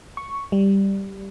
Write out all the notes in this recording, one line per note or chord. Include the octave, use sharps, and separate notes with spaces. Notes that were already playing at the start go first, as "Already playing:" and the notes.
C#6
G3